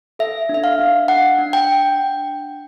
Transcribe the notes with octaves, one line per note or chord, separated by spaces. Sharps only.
A4 E5
D4
E5
F5
D4
D4 F#5
D4
G5